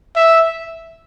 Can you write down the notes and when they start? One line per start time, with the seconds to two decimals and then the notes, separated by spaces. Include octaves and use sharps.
0.16 E5